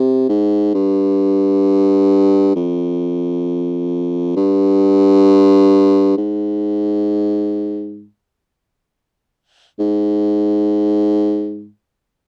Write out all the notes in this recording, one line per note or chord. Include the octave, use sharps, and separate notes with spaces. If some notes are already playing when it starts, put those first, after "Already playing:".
Already playing: C3
G#2
G2
F2
G2
G#2
G#2